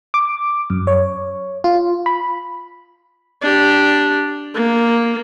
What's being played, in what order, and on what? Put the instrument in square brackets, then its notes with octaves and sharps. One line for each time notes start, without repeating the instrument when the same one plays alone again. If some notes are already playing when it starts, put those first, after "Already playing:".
[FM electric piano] D6
F#2
C#5
F4
B5
[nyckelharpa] D4 G4
A#3